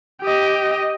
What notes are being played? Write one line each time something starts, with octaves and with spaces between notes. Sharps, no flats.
G4 D#5